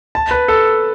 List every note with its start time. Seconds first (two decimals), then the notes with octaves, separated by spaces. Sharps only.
0.15 A5
0.31 B4
0.48 A4